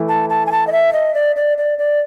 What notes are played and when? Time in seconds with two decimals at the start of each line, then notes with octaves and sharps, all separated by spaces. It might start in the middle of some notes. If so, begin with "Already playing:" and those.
Already playing: E3 A3 E4
0.09 A5
0.30 A5
0.46 G#5
0.52 A5
0.67 D#5
0.72 E5
0.93 D#5
1.14 D5
1.36 D5
1.58 D5
1.79 D5